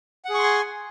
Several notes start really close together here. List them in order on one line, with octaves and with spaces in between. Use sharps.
F#5 G#4 C#6 C6 G#5